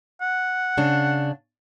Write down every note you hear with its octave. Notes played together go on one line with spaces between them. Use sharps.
F#5
C#3 D4